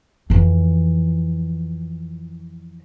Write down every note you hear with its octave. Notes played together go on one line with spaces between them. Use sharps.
F2 E3